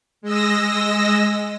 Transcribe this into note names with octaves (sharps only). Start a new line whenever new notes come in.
G#3 D#5 E6 A#6